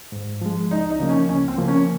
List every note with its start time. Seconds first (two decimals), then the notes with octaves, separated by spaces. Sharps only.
0.12 G#2
0.41 F3 G#3
0.71 C#2 D#4
0.90 D#4
1.00 C#3 F3 A#3
1.09 C#4
1.29 C#2 C#4
1.48 C4
1.58 C#3 F3 A#3
1.68 C#4